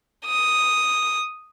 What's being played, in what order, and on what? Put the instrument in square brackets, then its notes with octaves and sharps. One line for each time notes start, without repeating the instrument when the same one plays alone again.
[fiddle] D#6